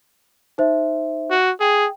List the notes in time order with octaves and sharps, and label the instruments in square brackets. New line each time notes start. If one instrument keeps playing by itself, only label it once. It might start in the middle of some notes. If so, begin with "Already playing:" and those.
[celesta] D#4 C5 E5
[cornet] F#4
[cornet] G#4 [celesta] G5